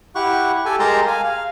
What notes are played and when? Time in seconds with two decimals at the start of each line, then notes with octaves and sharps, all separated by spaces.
0.15 E4 G4 F#5 C#6
0.66 G4 A4 G#5
0.80 G#3 G4 A#4 A5 A#5 C6
1.07 F5 G#5
1.24 F5